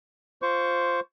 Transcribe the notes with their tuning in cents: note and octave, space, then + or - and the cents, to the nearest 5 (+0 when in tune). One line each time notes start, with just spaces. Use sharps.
F4 +0 C5 +0 C#6 +20